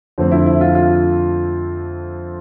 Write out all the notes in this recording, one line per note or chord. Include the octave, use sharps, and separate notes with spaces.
F2 D3 A3 C4
E4
E4
F4
F4